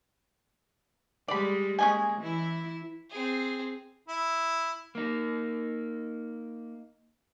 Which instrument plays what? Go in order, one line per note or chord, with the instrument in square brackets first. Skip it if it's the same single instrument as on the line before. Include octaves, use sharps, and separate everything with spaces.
[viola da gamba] G3 G#3 [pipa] D5 B5
[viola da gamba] G#3 A#3 [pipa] C#4 D#5 G#5
[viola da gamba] E3 E4
[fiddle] C4 G#4
[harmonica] E4
[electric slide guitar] A#3 D#4